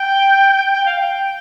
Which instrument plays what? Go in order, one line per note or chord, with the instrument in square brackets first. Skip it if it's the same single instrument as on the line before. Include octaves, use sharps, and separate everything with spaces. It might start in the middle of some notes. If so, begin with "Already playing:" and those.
Already playing: [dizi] G5
G5
F5
G5